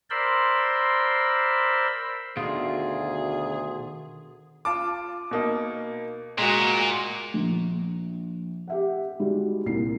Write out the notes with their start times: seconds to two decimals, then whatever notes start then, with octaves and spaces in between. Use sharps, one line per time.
0.10 A#4 C5 D5 B5 C6 E6
2.37 D2 B2 D#3 F4 G#4
4.65 F4 A5 D6
5.31 B2 A#3 D#4
6.38 A#2 G#3 F#4
7.34 A#1
8.68 G4 E5 F#5
9.20 G3 G#3 D#4 F#4
9.66 C2 A#2 C7